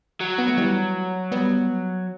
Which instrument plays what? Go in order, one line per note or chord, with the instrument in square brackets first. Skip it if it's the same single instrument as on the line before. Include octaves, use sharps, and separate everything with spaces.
[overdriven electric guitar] F#3
[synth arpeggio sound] B3
A3
E3 G3
G3 B3